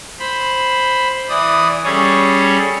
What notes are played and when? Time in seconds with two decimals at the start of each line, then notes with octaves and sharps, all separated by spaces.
0.19 C5 B5
1.29 E3 D5 D#6
1.84 G3 C#4 G#4 A4 C#5